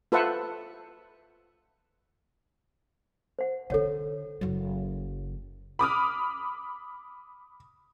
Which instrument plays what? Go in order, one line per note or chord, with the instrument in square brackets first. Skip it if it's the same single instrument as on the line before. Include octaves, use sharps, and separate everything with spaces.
[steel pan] F4 A4 B4 C5 E5 F#5
[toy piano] C5 F#5
[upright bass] D3 D#3 [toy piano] A4 C#5 F#5
[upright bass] F#1 F#3
[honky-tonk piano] B5 D6 D#6 F6